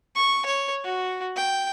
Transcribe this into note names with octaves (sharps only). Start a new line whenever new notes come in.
C#6
C#5
F#4
G5